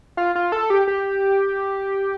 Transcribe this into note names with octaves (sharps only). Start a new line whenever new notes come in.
F4
F4
A4
G4
G4